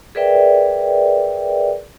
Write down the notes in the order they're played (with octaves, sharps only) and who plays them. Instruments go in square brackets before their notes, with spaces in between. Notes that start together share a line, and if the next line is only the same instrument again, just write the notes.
[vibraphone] G#4 A#4 B4 D5 E5 G5